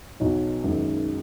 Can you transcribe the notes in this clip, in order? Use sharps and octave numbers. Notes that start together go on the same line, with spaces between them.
B1 B2 F#3
F#2 D#3 G#3